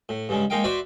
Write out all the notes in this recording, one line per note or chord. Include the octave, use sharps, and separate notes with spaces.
A2
G2 C#3 G#3
G#3 A#3 D#4 F5 G5
F#4 B4 C5 D5 E5